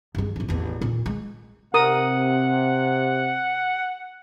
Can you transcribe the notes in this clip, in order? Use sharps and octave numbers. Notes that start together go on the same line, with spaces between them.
G2 G#3
A2 F3
A1 E2
A#2
G#3
C3 A#4 F#5 D#6